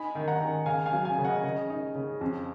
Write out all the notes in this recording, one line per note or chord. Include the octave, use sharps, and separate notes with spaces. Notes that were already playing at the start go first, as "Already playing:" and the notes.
Already playing: D#4 G#5 B5
D#3
F#5 A#5
D#3
C#3 F5 G#5
F5 G#5
F#3
F5 G#5
C#3
D#5 F#5
C#3 D#5
D#4
C#3
F2